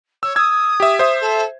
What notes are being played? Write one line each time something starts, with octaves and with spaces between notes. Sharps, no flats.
C#5 E6
D#6 E6 G#6
G4 E5
C5 E5
A4